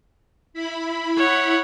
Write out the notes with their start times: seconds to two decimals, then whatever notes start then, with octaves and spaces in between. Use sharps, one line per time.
0.54 E4 B5
1.17 C#5 F#5